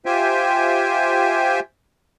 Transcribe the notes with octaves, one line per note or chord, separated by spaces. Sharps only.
F4 G4 C5 E5 G5 G#5